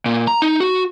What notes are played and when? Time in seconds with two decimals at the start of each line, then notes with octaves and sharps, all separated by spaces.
0.06 A#2
0.28 A#5
0.42 D#4
0.60 F#4